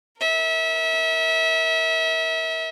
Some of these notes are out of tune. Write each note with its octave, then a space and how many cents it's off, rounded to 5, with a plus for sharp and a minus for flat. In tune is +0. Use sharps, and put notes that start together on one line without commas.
A#4 +0 E5 -30